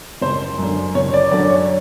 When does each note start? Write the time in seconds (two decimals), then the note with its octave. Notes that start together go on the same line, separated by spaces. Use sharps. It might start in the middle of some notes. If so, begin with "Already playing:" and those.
0.22 F#1 C5
0.58 F#2 D3
0.95 F#1 C#5
1.14 D5
1.31 F#2 D3 D5
1.50 C#5